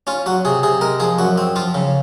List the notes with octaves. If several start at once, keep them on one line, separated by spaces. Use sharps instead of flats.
C#4 F4
F#3 F#4
C3 G#4
C3 G#4
G#3 A#4
F3 G#4
F#2 F#4
C4
F3 F4
C#3